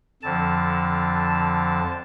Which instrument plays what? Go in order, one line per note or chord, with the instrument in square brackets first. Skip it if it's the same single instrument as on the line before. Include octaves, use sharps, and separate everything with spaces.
[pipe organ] F2 D3 F3 A5